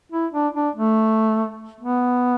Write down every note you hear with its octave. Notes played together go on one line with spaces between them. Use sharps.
E4
D4
D4
A3
B3